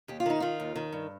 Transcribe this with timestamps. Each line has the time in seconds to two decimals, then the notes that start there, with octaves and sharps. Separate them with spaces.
0.08 D#2 G4
0.20 F4
0.26 D#3 D#4
0.40 D#3 F4
0.60 D#2
0.76 D#3
0.93 G2